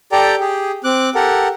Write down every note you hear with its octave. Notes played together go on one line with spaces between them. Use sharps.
G4 A4 D5 G5 A#5
G4 G#4
C4 D6 F#6
G4 A4 A#4 F#5